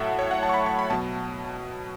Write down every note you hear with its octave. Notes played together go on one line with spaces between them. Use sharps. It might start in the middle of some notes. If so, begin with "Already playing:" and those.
Already playing: A2 F#3 E5 F#5 A5
C#5
F#5
A5
C#6
B5
C#6
B5
B2 F#3 A5